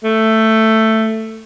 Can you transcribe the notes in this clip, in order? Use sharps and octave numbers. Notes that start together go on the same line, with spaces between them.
A3